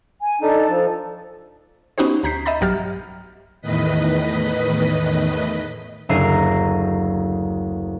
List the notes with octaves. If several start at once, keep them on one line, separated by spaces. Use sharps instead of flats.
G#5
D4 D#4 A4
F3
B3 C#4 D#4 F#4 G4 C5
D2 A#5 G6 B6 C7
D#5 E5 A#5 B5 A6
B1 G2 F#3 G4 F6 A6
E2 A2 D#3 B4 D#5 B6
F#1 D2 E5 A#5 C7 D#7